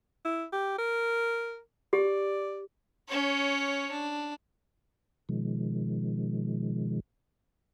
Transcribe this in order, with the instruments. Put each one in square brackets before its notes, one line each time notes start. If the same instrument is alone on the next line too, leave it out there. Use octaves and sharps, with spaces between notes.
[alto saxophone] E4
G4
A#4
[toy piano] G4 [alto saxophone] D5
[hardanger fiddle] C#4 C#5
D4
[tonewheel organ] B2 D#3 F3 G#3